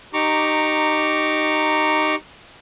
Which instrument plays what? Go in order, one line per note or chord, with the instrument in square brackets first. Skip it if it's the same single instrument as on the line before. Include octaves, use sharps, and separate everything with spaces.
[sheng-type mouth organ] D#4 G4 A#5 C#6 D6